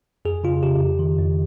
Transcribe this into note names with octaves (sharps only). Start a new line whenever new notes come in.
F2 G#4
C#3 F4
C#3 G4
F2
D#3
F2